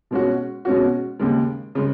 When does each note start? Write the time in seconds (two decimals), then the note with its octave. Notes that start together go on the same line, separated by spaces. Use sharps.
0.11 B2 G#3 C#4 F#4
0.65 B2 G#3 C#4 F#4
1.20 D#2 C#3 G#3
1.75 C#3 G#3